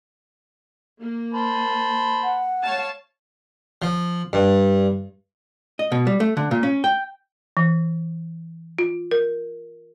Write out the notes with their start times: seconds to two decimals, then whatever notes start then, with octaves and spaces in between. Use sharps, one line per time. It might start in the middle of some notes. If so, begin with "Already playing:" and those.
1.00 A#3
1.34 C5 A5 B5
2.24 F#5
2.63 C#5 F5 A5
3.82 F3
4.33 G2
5.79 D#5
5.92 B2
6.07 G3
6.20 A3
6.37 D3
6.51 A#2
6.63 C#4
6.84 G5
7.57 E3
8.79 F4
9.11 A#4